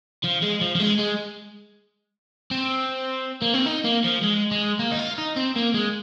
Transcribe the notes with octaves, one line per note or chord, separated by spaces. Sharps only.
F3
G#3
F3
F3
G#3
G#3
C4
A#3
C4
D#4
A#3
F3
G#3
G#3
A#3
D#4
F4
D#4
C4
A#3
G#3